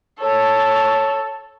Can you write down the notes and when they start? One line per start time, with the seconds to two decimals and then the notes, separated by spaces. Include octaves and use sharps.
0.19 A4 C#5